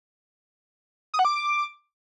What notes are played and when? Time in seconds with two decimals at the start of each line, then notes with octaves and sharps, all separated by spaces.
1.14 D#6
1.19 F#5
1.25 D6